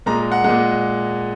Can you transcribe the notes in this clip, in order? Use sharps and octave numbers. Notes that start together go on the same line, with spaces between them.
A#2 G#3 A#5
F#5
A#2 G#3 F#5